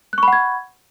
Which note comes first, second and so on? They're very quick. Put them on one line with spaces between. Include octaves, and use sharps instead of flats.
F#6 C#6 B5 F#5 G#6